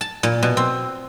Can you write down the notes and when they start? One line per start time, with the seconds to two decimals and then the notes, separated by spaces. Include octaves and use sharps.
0.01 A5
0.23 A#2
0.43 B2
0.57 C4